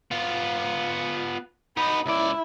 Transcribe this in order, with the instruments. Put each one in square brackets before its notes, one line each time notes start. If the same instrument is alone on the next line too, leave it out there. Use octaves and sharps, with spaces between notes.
[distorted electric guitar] B3 F4
[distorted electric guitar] B3 D#4 [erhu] B5
[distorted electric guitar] C#2 D5 [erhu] E4